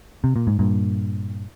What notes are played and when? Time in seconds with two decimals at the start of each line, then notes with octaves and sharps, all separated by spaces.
0.24 C3
0.36 A#2
0.47 G#2
0.59 G2 A#2